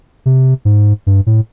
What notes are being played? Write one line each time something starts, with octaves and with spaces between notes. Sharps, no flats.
C3
G#2
G2
A2